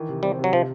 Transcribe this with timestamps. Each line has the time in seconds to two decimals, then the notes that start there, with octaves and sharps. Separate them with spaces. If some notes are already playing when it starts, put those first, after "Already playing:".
Already playing: D#3 E3
0.09 C3
0.23 G3 C4
0.39 C3
0.44 F#3
0.53 C3 F3